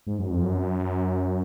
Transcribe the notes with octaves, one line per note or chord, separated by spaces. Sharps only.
G#2
F#2
F2
F#2